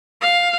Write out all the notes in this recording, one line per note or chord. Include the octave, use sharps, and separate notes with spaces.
F5